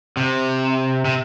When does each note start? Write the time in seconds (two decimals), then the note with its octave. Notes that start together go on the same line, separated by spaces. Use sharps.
0.17 C3
1.05 C3